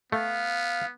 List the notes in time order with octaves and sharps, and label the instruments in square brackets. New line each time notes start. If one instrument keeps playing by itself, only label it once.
[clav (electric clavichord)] A3 [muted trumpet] B3 [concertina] F5